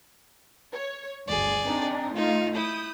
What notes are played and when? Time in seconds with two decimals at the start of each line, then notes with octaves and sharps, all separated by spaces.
0.73 C#5
1.28 G1 D2 G#4 D5
1.66 C4 D4 D#4
2.16 A3 D#4 F4 F5
2.55 E4 D#6 G6